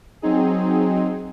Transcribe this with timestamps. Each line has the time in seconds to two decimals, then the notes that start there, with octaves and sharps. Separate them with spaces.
0.22 F#3 C4 D#4 G#4